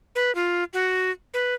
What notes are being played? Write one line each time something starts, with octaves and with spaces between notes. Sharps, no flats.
B4
F4
F#4
B4